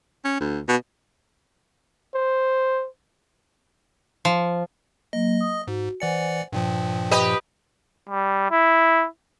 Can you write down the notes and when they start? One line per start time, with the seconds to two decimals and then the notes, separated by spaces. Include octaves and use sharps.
0.25 C#4
0.40 D2
0.69 B2
2.14 C5
4.25 F3
5.13 F#3 A#3 D#5
5.41 D#6
5.68 G#2 F#4
6.00 E3 C5 D5 F#5 G#5 C#7
6.53 G2 A#2 F3 G5
7.11 G4 B4 D#5
8.09 G3
8.51 E4